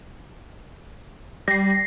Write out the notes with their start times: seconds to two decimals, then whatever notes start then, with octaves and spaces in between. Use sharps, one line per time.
1.48 G3 A#6 C7